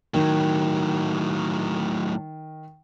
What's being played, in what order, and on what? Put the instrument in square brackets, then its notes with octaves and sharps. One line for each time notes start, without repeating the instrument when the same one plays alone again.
[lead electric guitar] A2 F#3 [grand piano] D#3